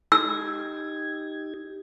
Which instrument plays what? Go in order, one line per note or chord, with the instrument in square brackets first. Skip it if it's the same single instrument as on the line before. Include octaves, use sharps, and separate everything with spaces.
[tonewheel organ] D#4 G4 G#6 [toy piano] E6